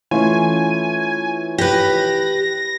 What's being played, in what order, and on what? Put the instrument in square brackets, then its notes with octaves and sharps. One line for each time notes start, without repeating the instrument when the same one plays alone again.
[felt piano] E3 A3 C#4 [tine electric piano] E4 F4 C#5 [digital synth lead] G#5
[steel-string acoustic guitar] G4 B4 [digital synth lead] A#6